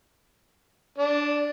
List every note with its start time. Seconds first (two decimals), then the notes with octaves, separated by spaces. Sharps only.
0.98 D4